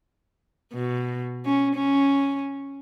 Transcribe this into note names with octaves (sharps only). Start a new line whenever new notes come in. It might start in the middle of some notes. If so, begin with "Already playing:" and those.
B2
C#4
C#4